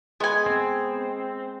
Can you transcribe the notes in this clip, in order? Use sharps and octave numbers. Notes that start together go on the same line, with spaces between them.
G#3 B3 G#5
C4